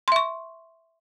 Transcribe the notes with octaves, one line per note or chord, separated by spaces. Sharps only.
E5 C6 C#6